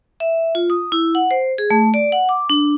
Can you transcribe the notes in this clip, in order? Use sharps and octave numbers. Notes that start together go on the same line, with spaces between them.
E5
F4
D#6
E4
F#5
C5
G#4
A3
D5
F#5
D6
D4